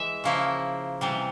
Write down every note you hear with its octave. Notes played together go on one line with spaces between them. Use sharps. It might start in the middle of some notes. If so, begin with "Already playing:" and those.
Already playing: E3 G#3 E5
C#3 F3 A#3 E4
C3 E3 G3